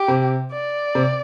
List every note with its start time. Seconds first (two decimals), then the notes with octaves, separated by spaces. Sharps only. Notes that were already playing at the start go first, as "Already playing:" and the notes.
Already playing: G4
0.08 C3
0.52 D5
0.95 C3